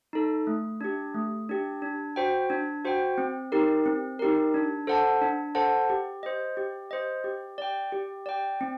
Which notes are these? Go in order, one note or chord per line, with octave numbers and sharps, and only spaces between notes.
D#4 A4
A3
D4 G4
A3
D4 G4
D4
F#4 C5 G5
D4
F#4 C5 G5
C4
D#4 G4 A#4
C4
D#4 G4 A#4
D4
A4 C5 F#5 A5
D4
A4 C5 F#5 A5
G4
C5 D#5
G4
C5 D#5
G4
D5 G5
G4
D5 G5
C4